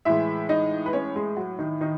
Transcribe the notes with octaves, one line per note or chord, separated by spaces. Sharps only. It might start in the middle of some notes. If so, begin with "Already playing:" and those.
A2 E3 G#3 E4 E5
D#4 D#5
B4
C#4 C#5
G#3 G#4
F#3 F#4
D#3 D#4
D#3 D#4